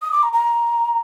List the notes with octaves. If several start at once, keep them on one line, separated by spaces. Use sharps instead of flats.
D#6
D6
A#5
A#5